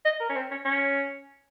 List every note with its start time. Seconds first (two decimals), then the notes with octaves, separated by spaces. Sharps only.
0.05 D#5
0.20 A#4
0.29 C#4
0.36 C4
0.51 C#4
0.65 C#4